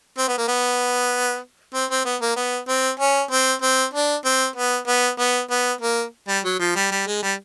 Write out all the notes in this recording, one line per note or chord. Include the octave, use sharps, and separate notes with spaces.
C4
B3
A#3
B3
C4
C4
B3
A#3
B3
C4
C#4
C4
C4
D4
C4
B3
B3
B3
B3
A#3
G3
F#3
F3
G3
G3
G#3
G3